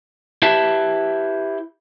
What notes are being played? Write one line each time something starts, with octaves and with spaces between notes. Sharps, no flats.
E4 G4 B4 E5 A5